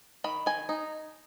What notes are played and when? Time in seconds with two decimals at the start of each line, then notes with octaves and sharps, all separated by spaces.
0.24 D#3 B5
0.46 D#3 G#5
0.69 D#4